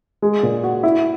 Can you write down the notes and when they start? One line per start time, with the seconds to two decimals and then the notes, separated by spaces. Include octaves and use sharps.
0.22 G#3
0.43 A#2
0.64 F#4
0.83 E4